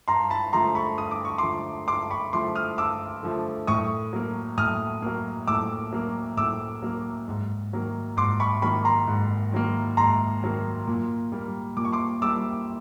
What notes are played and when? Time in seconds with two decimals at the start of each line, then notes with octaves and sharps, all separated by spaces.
0.08 G2 A#5 C6
0.30 A5 B5
0.53 D3 F3 A3 A#5 C6
0.75 B5 C#6
0.98 G2 D#6
1.11 D6
1.25 C#6
1.38 D3 F3 A3 C6 D6
1.88 G2 C6 D6
2.11 B5 C#6
2.33 D3 F3 A3 C6 D6
2.55 D#6 F6
2.78 G2 D6 E6
3.23 D3 F3 A3
3.67 A2 C#6 D#6
4.13 F#3 A#3
4.58 A2 D#6 F6
5.02 F#3 A#3
5.47 A2 D6 E6
5.93 F#3 A#3
6.37 A2 D6 E6
6.82 F#3 A#3
7.28 G#2
7.73 D#3 F#3 A#3
8.17 G#2 C6 D6
8.40 B5 C#6
8.62 D#3 F#3 A#3 B5 C#6
8.85 A#5 C6
9.07 G#2
9.52 D#3 F#3 A#3
9.97 G#2 A#5 C6
10.42 D#3 F#3 A#3
10.87 A#2
11.32 G3 A#3
11.77 A#2 D6
11.85 C#6
11.92 C6 D6
12.22 G3 A#3 D6 E6